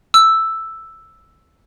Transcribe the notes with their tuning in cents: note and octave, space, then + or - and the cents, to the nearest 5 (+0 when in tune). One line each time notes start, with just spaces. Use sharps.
E6 +0